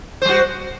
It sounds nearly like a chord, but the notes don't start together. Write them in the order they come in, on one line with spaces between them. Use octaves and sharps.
C5 G3 F#4